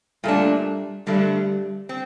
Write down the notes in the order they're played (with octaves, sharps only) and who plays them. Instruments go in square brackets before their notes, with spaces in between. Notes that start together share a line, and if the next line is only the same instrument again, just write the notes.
[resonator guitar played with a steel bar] A#2 A3 D4 [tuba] G3
[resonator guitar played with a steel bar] G2 D3 A3 [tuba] G3
[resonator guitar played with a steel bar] C4